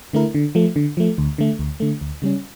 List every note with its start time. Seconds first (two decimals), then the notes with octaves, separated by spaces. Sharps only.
0.13 D3 A3 E4 A#4
0.35 D3
0.55 F3 A3
0.76 D3
0.97 F3 A3
1.18 D2
1.38 D3 A3
1.59 D2
1.80 D3 A3
2.01 D2
2.22 C#3 G3 C#4